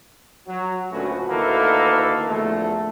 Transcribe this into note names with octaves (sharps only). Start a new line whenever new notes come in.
F#3
D2 A#2 A3 C#4 F#4 B4
D2 D#3 A#3 E4 A4 B4
A#1 E2 D3 A3